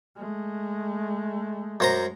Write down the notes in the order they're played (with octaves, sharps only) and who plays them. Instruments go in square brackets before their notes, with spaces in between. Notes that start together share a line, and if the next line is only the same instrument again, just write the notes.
[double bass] G#3 A3
[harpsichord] F#2 C5 A#5